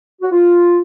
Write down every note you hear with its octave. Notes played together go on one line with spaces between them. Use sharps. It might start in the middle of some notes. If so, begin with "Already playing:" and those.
F#4
F4